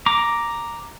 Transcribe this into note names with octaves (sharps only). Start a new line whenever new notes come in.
A#5 D6